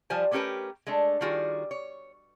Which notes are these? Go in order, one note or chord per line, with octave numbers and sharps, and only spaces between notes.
F3 G3 C5 G#5
A3 B3 C#4 G4 A#4 B4
G#3 A3 D4
D#3 G3 F4 F#4 G#4
C#5